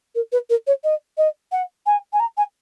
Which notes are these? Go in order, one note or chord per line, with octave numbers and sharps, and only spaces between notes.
A#4
B4
A#4
C#5
D#5
D#5
F#5
G#5
G#5
A#5
G#5